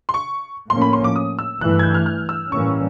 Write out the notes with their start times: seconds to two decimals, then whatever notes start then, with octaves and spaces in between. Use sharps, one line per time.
0.09 C6
0.14 C#6
0.70 A2 F3 A#3 C#4 C6
0.82 B5
0.93 C6
1.04 D6
1.16 D#6
1.39 E6
1.60 G2 E3 A3 F#6
1.79 G#6
1.83 G6
1.94 F6
2.06 F6
2.29 E6
2.51 A2 E3 G3 A#3 C#4 C#6